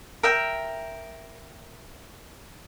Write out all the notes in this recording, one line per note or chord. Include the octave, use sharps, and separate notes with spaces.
A#4 E5 G5